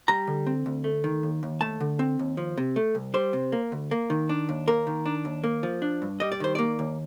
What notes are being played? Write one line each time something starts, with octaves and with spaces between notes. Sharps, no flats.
G3 A#5
D3
C4
D2
A3
D#3
D#2
D#2
A3 A5
D3
C4
D#2
F3
C3
A3
C2
G3 C5
C3
A#3
D2
A#3
D#3
D4
D#2
A#3 A#4
D#3
D4
D#2
A#3
F3
D4
G2
G3 D#5
D5
D#3 C5
A#3 D5
D#2